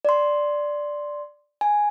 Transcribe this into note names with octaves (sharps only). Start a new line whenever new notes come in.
D5 C6
G#5